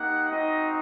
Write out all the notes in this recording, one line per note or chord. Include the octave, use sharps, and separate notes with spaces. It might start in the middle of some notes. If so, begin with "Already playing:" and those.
Already playing: A#3 D#4 G4 F#5
C4 D#4 F#4 D#5